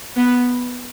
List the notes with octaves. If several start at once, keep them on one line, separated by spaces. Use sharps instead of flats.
B3